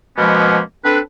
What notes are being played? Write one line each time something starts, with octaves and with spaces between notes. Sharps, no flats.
B2 F3 G#3 A#3 B3 C#4
C4 D4 A4 B4